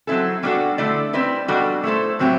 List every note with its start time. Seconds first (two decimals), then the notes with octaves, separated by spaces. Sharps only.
0.07 F#3 C4 E4 A4
0.43 B2 G3 D4 F#4 A4
0.78 D3 A3 E4 A4 D5
1.13 G3 C4 E4 B4
1.48 B2 G3 D4 F#4 A4
1.83 A3 E4 A4 C5
2.19 A2 F#3 C4 E4 G4